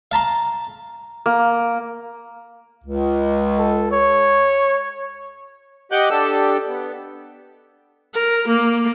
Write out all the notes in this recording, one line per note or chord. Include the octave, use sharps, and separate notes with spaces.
F5 A5 A#5 C6
A#3
C#2
A4
C#5
G4 D#5 F#5 D6 F#6 G6
D4 G4 A4 E6
B3
A#4
A#3